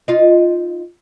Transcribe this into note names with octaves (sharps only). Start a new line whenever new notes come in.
D#4 F4